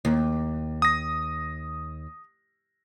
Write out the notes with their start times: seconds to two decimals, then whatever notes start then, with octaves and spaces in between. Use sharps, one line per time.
0.05 D#2
0.82 D#6 A#6